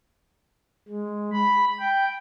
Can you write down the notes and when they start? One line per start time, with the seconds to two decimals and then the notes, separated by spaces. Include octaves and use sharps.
0.88 G#3
1.33 B5
1.80 G5